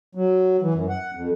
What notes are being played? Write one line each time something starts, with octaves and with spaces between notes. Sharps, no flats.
F#3
E3
F#2
F#5
F2